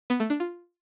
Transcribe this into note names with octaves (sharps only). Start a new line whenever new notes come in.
B3
A3
D4
F4